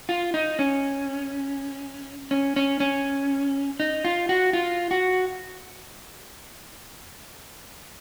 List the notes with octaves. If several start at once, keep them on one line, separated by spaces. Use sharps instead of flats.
F4
D#4
C#4
C#4
C#4
C#4
D#4
F4
F#4
F4
F#4